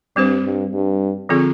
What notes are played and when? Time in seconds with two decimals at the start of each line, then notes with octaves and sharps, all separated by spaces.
0.16 G2 G3 C4 G4 C5
0.44 G2
0.73 G2
1.29 D3 F3 C4 F4 G#4